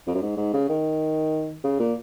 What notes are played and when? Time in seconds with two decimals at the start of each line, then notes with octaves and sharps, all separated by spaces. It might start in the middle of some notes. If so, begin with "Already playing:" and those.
0.07 F2
0.15 F#2
0.22 G#2
0.37 G#2
0.53 C#3
0.69 D#3
1.64 C#3
1.80 A#2